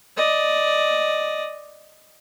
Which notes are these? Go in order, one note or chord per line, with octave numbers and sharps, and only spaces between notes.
D5 D#5